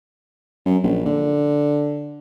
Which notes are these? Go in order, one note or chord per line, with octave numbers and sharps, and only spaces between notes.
F#2
A#1
D3